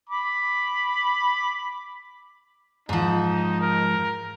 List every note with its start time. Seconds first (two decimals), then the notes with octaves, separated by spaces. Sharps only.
0.09 B5 D6
2.89 G#2 F3 D#4
3.61 A#4